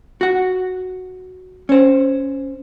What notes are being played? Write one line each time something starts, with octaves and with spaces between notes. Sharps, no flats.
F#4 F#5
C#4 C5